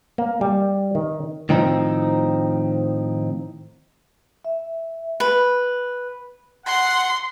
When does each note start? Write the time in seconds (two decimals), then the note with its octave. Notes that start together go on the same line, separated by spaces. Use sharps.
0.18 A#3
0.41 G3
0.95 D#3
1.49 A2 D#3 F3 C4 D#4
4.45 E5
5.20 B4
6.66 F#5 C6